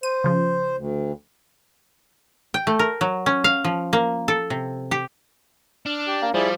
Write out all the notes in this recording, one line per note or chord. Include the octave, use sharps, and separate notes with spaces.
C5 D#7
C#3 F3
D2
G5
A3
A#4
F#3
C#4
F5
F3
A#3
A4
C3
G4
D4 F6
G4
A#3
F3 G3 E4 G#4 D5